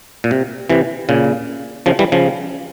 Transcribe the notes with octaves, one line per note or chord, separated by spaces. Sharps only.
A#2
C3
C3 E3
A#2 C#3
C#3 F3
E3 G3
C#3 F3